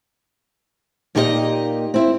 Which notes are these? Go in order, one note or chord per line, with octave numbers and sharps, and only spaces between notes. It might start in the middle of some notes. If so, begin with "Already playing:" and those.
A#2 A#3 D#4 G4 A4 D#5
C4 E4